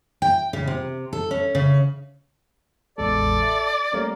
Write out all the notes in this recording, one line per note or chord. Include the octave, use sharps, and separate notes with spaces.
G5
C#3
C3
A4
C#4
C#3
A1 E2 G#3 A4 D5
E5
G3 A3 A#3 C#4